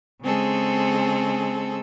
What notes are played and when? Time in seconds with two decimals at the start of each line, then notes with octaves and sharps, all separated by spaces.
0.22 C#3 G#3 C4 G#4 A4